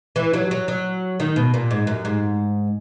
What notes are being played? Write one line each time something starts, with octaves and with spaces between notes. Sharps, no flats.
E3
F#3
F#3
F#3
D#3
B2
A#2
G#2
F#2
G#2